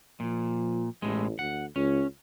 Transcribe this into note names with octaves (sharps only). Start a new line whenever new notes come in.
A#2 F3
A1 A2 G#3
D2 F#5
C#2 C#4